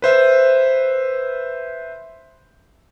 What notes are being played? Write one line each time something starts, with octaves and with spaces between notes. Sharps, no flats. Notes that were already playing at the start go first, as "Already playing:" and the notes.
B4 C5 E5